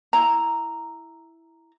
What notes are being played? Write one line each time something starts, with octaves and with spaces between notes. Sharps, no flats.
E4 A#5